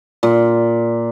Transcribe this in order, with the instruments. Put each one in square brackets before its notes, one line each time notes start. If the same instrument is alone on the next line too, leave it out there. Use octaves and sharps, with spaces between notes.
[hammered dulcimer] A#2